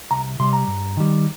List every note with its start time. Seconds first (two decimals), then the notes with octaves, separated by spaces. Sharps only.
0.11 C2 A#5
0.39 C3 G3 C6
0.53 A#5
0.67 G2
0.97 D#3 G3